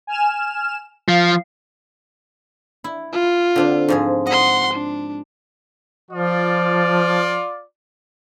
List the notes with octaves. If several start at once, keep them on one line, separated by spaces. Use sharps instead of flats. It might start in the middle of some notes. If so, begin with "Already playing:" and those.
G#5 F6 E7
F3 F5
E4
F4
D3 C4 D4
G#2 F3 G#4
D#5 F#5 C6
D4
F3 F4 D5